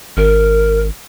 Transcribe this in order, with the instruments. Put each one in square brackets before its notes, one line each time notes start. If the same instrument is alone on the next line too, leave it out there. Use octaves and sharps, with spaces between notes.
[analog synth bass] G#1 [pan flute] A#4